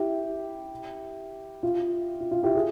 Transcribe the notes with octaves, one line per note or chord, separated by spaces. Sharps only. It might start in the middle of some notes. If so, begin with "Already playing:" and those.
Already playing: E4 G4
F4
F4
F4
E4 G4
F4 G#4